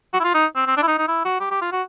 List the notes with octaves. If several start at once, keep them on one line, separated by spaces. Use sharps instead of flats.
F#4
E4
F4
D#4
C4
C4
D4
E4
D#4
D#4
E4
F#4
G4
G4
F4
F#4